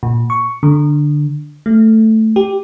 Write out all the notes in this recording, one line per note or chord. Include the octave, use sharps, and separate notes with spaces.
A#2
C#6
D3
A3
G4